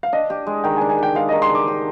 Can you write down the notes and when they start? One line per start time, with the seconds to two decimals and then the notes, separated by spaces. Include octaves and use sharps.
0.03 F5
0.13 D4 D#5
0.30 G4
0.47 G#3
0.64 D#3 G5
0.77 G#5
0.81 D4
0.90 G#5
0.98 G4 G5
1.15 G#3 F5
1.29 D#5
1.33 D#3
1.42 C6
1.49 D4
1.55 D6
1.68 G4